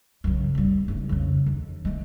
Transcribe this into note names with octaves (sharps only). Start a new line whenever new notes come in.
F#2 C#3
F1 G3
F#1 A3
F2 C#3
D#2
G#3 A3